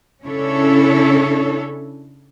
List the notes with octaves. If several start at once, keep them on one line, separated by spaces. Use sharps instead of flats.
C#3 C#4 D4 E4 A4 C#5